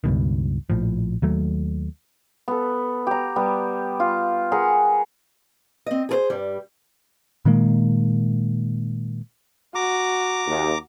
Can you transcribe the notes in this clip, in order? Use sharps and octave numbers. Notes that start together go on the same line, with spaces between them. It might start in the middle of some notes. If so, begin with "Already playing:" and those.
C#2 G2 B2 D#3
A#1 A2 F3
D#2 F#3 A3
B3 A4
G4 A#5
G3 B3
F4
G#4 A#4 F#5
C4 D#5
G#4 A4 C5
G2 G3
A#2 D#3 G#3 A#3
F#4 A#5 D6
D#2